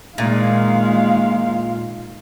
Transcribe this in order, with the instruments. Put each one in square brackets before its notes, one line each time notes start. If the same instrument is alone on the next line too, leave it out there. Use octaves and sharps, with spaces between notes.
[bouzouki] A#2 [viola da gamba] D#3 G#3 [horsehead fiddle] F5